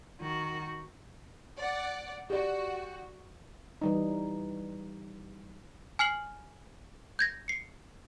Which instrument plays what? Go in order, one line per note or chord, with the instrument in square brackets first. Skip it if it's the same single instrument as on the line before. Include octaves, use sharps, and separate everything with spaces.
[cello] D#3 F#4
[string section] D5 F#5
[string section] F#4 [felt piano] G4 D5
[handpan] E3 G3 D#4
[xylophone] G#5 F6 C7 F#7
G6 G#6 A#6
C7 C#7